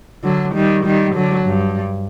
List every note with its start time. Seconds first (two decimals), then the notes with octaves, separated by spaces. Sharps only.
0.24 D3 F#3
0.55 D#3 G3
0.85 D#3 G3
1.15 D3 F#3
1.47 G2